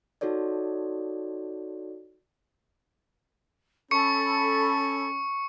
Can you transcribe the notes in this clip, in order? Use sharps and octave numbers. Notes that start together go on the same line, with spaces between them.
D#4 F#4 A4 C#5 D5
C#4 A4 B5 C#6 C#7